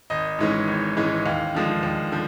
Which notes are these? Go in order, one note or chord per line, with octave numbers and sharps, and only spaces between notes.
G#1 D#5
G#2 E3 G#3 C#4
G#1
G#2 E3 G#3 C#4
D#2 F5
D3 F3 G#3
D#2
D3 F3